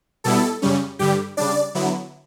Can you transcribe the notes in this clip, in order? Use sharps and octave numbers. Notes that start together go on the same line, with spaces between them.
B2 G3 B3 E4 A4
F#2 C#3 G3 C#4
G2 D3 G3 G4
C#3 G3 D4 D5
D3 F#3 B3 E4